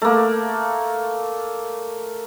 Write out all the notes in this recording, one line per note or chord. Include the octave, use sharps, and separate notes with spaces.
A3 A#3